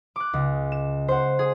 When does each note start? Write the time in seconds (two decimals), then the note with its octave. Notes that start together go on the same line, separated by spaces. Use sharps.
0.16 D6 F#6
0.33 C#2
0.72 E7
1.08 C5 F#5
1.39 G#4